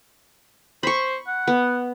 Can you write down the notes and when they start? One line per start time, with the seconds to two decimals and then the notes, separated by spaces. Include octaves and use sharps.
0.83 C5 B5 C#6
1.27 F#5
1.48 B3